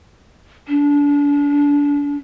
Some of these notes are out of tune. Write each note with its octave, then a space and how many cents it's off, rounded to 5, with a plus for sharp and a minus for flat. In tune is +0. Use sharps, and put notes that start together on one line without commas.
D4 -30